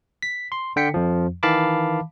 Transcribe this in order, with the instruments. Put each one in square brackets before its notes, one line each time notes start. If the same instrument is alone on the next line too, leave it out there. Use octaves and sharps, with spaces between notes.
[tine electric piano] B6
C6
D3 G5 B6 C#7
F2 F3
D#3 E3 F5 A5 B5 D6